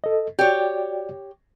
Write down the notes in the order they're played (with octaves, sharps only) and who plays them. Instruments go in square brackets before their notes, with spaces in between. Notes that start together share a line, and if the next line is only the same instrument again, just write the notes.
[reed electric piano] A4 D#5
[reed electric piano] F#4 D5 G5 [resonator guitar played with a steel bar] G4 C#5